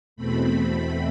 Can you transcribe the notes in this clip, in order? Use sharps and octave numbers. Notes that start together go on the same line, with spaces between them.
E2 B2 A3 C4 B5